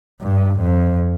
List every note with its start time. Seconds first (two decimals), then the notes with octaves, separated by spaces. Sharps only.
0.22 G2
0.61 F2